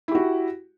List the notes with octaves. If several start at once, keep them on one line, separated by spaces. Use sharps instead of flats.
E4 F#4 G4